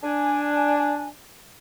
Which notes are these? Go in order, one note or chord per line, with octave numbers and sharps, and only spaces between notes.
D4 G#5